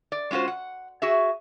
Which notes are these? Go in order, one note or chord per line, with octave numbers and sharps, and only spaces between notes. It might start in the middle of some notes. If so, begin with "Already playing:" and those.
D5
G#3 C#4 F4 F#4 C5
F#5
F#4 G#4 E5